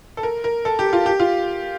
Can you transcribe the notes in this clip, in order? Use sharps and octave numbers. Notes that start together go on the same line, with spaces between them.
A4
A#4
A#4
A4
G4
F4
G4
F4